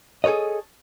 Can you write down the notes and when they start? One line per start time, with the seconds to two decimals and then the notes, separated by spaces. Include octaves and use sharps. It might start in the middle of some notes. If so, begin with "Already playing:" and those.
0.24 G#4 A4 B4 C#5 D#5